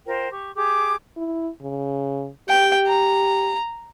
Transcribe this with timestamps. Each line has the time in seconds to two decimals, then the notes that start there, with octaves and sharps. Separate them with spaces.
0.07 F4 A#4 C5 G5
0.31 G4 C#6
0.56 G4 G#4 D6
1.17 E4
1.62 C#3
2.49 G4 G5
2.87 A#5